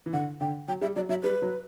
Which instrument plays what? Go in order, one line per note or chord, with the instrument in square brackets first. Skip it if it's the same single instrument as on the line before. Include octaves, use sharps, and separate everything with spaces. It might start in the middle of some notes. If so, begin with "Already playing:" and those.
[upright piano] E3
[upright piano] D3 [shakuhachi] F#5
[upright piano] D3 [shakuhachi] G5
[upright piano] F#3 [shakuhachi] G5
[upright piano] G3 [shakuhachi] E5
[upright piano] F#3 [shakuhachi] D5
[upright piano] F#3 [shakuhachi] E5
[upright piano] G3 [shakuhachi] B4
[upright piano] F#3